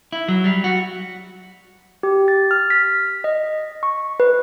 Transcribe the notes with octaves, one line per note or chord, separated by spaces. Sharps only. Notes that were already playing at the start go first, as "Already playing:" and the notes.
E4
F#3
G3
F#4
G4
A6
F6
B6
D#5
C#6
B4